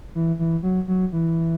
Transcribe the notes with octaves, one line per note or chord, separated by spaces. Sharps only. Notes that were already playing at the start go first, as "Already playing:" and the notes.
E3
E3
F#3
F#3
E3